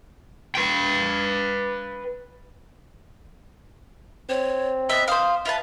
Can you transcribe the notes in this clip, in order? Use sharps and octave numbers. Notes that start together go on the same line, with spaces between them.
B4 G5
C4 C#5
B3 D#5 E5
C5 F5 D#6
F4 B4 E5 A5